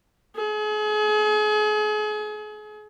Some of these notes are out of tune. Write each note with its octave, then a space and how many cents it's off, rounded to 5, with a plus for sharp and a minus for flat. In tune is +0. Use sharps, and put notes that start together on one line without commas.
G#4 +35